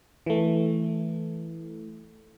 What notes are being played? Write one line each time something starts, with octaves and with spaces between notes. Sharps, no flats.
E3 A3